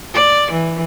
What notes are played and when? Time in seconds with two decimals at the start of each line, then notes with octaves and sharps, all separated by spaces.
0.14 D5
0.52 E3